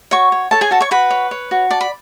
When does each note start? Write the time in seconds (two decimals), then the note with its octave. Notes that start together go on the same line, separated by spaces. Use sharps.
0.11 F#4 C#5 C#6
0.32 C#5
0.51 A4 C#5 A5
0.61 G#4 G#5
0.71 F#4 A4 A5
0.81 C#5 C#6
0.91 F#4 B4 B5
1.10 C#5
1.31 C#5
1.51 F#4
1.70 D5 A5
1.81 B5